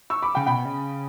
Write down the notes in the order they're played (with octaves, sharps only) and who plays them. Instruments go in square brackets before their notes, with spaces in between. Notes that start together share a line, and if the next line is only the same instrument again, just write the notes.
[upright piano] C#6 E6
B5 D6
[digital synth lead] C#3 [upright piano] G5 B5
[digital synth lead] B2 [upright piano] G5 B5
[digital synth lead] C#3